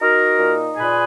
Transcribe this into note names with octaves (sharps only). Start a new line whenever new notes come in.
D#4 F#4 A#4
A#2
A#2 G#4 B4